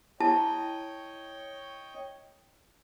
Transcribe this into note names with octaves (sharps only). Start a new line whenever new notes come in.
E4 C#5 D#5 G5 A5